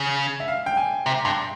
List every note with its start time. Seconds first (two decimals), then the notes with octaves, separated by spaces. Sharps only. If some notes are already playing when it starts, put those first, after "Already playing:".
Already playing: C#3
0.40 E5
0.48 F5
0.66 G5
0.77 G#5
1.06 C3 A#5
1.25 G2 C6